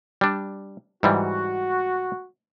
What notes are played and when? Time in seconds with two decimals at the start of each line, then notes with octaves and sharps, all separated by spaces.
0.21 G3 D4
1.03 G#2 E3 G3 F#4